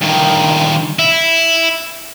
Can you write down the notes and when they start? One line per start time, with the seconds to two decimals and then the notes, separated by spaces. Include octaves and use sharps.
0.01 G2 D#3
0.99 E4